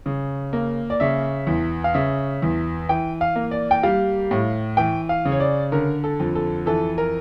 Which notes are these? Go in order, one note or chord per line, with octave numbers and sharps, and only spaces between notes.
C#3
A#3
D5
C#3 E5
E2
F5
C#3 E5
E2
E3 G5
F5
A#3
D5
G5
G3 F5
A2
E3 G5
F5
C#3
C#5
D5
D3 A#4
A4
F2
A4
E3 A4
A#4